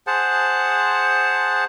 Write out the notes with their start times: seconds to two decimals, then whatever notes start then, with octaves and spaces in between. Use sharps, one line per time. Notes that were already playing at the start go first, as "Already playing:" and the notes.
0.07 G#4 C5 F#5 A5